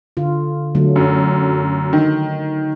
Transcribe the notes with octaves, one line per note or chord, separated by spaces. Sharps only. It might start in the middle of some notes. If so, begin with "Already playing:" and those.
D3 F4
D3 F#3 A3
F#2
D#3